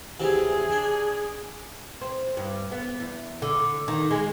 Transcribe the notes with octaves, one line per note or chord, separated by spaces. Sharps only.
D2 C3 E3 G#4
D4
C4
G2
B3
E2
D3
D#3
G#3